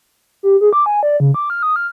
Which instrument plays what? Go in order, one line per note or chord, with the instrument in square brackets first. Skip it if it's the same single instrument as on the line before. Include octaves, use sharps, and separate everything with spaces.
[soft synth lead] G4
G#4
D6
G#5
D5
C#3
D6
F6
D#6
F6